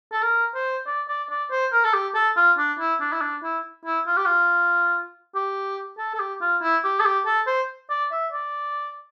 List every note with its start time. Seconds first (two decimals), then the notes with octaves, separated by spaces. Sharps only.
0.12 A4
0.23 A#4
0.55 C5
0.87 D5
1.09 D5
1.30 D5
1.51 C5
1.73 A#4
1.85 A4
1.93 G4
2.14 A4
2.37 F4
2.58 D4
2.79 E4
3.01 D4
3.12 E4
3.21 D4
3.43 E4
3.85 E4
4.07 F4
4.17 G4
4.26 F4
5.35 G4
5.98 A4
6.14 A4
6.19 G4
6.42 F4
6.62 E4
6.84 G4
7.00 A4
7.05 G4
7.26 A4
7.47 C5
7.90 D5
8.12 E5
8.32 D5